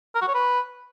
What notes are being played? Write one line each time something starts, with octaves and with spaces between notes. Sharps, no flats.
A#4
F#4
C#5
B4